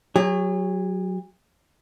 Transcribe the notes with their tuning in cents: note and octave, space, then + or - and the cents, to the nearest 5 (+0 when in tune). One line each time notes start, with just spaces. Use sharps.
F#3 +0 G#4 -45 C#5 +0